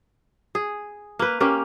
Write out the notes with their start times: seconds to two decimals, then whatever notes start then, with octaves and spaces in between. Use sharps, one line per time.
0.55 G#4
1.19 A#3 B4
1.41 A#3 C#4 G4